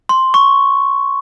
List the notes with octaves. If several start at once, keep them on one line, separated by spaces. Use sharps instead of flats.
C6
C#6